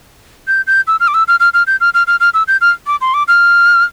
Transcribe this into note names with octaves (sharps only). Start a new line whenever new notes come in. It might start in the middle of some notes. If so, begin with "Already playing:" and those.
G6
G6
E6
F6
D6
E6
F6
F6
F6
G6
F6
F6
F6
F6
E6
G6
F6
D6
C6
D6
F6